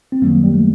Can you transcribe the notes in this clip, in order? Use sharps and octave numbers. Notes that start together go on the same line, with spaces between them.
C4
F#2 D#3 F#3 G3 A#3
G3
A3